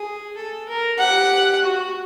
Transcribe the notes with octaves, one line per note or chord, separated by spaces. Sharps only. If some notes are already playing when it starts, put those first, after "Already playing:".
Already playing: G#4
A4
A#4
G4 F#5
F#4